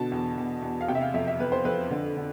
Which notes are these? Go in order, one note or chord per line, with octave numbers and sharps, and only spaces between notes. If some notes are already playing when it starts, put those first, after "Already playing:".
Already playing: B2 D3 A5
E2
E2
E2
F5
C3 G5
E5
F5
F2 E5
E5
F2 B4
C5
F2 B4
D3
D3